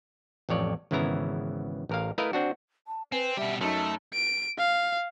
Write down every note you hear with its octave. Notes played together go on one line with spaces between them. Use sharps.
A1 F2 C#5 D5
G#1 C#3 E3 B3 E4 A#5
A1 A#4 F5
A3 E4 A#4 B4 D#5 F5
C4 D4 F#4
A5
C4 B4 G#5
B2 G3 G4 E5
F#2 A3 D#4 A5
D7
F5